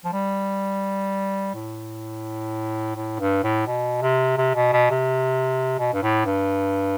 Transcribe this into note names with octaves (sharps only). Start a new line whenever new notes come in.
F3
G3
A2
A2
G2
A2
B2
C3
C3
B2
B2
C3
B2
G2
A2
G2